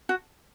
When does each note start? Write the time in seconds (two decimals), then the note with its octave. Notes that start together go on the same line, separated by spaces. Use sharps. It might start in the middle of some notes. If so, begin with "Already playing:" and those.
0.09 F#4